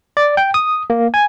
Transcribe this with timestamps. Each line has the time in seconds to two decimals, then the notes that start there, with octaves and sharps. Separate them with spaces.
0.17 D5
0.37 G5
0.54 D#6
0.90 A#3
1.14 G#5